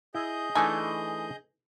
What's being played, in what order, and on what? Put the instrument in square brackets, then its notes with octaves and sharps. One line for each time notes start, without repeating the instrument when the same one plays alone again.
[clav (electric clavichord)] E4 [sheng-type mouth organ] G#4 D#5 G6
[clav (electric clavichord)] E3 A3 D#4 [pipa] D4 G#5